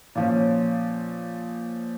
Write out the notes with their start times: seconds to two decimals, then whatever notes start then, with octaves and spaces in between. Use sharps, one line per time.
0.15 A#2 F3 C#4